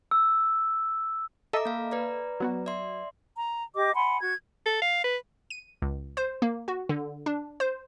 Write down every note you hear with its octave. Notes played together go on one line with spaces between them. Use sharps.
E6
A4 D#5 E5 A#5 D6
A#3 F5
B4 D5 A#5
F#3 B3 F#4
D5 E5 C6
A#5
G4 D#5 D6
F#5 G#5 B5 C6
F#4 G#6
A4
F5
B4
D#7
C#2
C5
A#3
F#4
D3
D4
C5